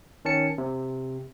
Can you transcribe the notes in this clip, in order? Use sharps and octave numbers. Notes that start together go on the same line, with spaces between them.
D#3 C#4 A5 C#7
C3